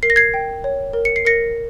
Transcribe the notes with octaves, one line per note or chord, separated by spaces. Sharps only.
A#4 C7
A#6
G#6 C7
G5
C#5
A#4
C#7
C7
A#4 A#6 C#7